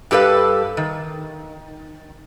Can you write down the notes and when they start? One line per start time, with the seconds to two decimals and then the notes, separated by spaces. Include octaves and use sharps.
0.11 G2 G4 A4 B4 F5
0.77 D#3